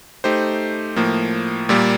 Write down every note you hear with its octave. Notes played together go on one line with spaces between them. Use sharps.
A3 D#4 G4 C5
A2 F3 A#3
A#2 G3 A#3